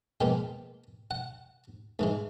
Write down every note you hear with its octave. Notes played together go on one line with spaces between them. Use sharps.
A#2 F3 G#3 B3 G5
F#5
G#2 E3 G#3